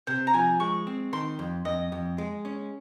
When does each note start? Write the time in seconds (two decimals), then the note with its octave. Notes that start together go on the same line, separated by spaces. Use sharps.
0.07 C3 C5
0.27 A#5
0.34 F3 G#5
0.60 G#3 C#6
0.87 C4
1.13 D#3 C6
1.39 F2
1.65 F2 D#5
1.92 F2
2.18 G#3
2.45 C#4